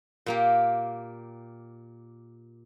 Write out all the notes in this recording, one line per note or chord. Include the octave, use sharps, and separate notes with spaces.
A#2 A#3 G4